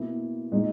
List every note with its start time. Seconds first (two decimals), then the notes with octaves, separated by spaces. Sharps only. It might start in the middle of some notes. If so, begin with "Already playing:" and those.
Already playing: B2 A#3 E4
0.52 A#2 G#3 D#4